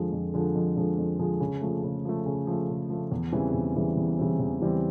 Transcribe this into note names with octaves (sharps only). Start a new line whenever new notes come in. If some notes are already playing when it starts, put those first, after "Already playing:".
Already playing: F2 D3 F3 G#3
F2
D3 F3 G#3
F2
D3 F3 G#3
F2
D3 F3 G#3
C#3
F3 A3
C#3
F3 A3
C#3
F3 A3
C#3
F3 A3
E2
C#3 E3 G3 C4
E2
C#3 E3 G3 C4
E2
C#3 E3 G3 C4
E2
C#3 E3 G3 C4